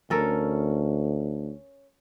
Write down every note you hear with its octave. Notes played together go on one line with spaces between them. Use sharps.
D2 C#4 A4 A#4